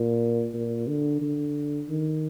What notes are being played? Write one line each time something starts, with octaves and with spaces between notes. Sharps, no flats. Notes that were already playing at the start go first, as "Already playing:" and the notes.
Already playing: A#2
A#2
D3
D3
D#3